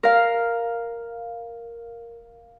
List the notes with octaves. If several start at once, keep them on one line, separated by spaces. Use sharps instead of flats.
A#4 F5